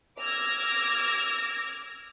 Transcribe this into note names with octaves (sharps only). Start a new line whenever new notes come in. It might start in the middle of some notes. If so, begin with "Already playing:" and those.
D6 E6 F6 G#6 A#6